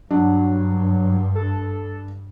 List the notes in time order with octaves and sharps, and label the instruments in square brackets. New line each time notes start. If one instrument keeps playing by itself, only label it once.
[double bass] G2 [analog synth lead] F#3 [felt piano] D4
[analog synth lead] A4